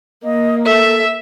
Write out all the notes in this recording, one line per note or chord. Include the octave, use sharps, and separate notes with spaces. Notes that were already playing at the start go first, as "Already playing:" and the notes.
A#3 D#5
A4 E5